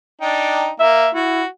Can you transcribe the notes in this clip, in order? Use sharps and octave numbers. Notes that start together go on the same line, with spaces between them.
D4 D#4 G5
A#3 E5
E4 F#4